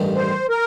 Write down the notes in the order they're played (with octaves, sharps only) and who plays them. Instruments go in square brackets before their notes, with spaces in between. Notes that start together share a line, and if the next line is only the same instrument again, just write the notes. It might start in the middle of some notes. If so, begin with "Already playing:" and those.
Already playing: [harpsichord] A1 G2 D#3
[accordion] C5
A#4